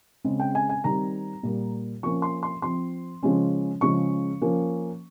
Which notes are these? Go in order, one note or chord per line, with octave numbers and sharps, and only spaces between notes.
C#3 G#3 C4
G5
G#5
G#5
D#3 G3 C4 A#5
A#2 G3 A#3
F3 A#3 C#4 C#6
C6
C6
F3 C4 C6
C#3 F3 G#3 C#4
C#3 F3 G#3 C#6
F3 A#3 C#4